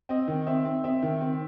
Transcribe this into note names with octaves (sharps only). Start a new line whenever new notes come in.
C4 D#5
D#3
C4 E5
C4
C4 E5
D#3
C4